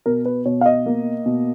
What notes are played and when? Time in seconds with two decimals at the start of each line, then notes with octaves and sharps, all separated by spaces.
0.06 B2 A#4
0.26 B4
0.45 B2 C#5
0.61 F5
0.66 D#5
0.86 A#3
1.26 B2